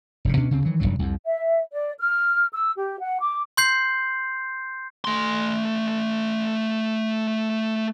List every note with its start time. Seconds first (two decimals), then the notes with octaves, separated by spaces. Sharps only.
0.25 F1 G2 C#3
0.36 D2 B2 C#4 D4
0.50 D2 C#3 G3 C4
0.65 D#3 E3 F#3
0.80 F1 C#2 G2 F#3
0.99 C2 F2
1.26 E5
1.72 D5
1.99 F6
2.53 E6
2.77 G4
3.01 F#5
3.21 D6
3.57 C6 G6 C7
5.05 A3 C6